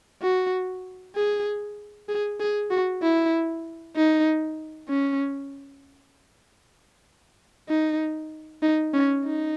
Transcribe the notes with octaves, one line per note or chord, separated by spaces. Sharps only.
F#4
G#4
G#4
G#4
F#4
E4
D#4
C#4
D#4
D#4
C#4
D#4